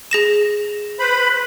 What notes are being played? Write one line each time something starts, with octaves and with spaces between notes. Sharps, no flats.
G#4 A#6 E7
B4 C5 B5